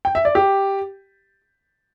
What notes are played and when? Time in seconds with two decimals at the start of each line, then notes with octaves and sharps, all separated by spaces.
0.05 G5
0.15 E5
0.25 D5
0.35 G4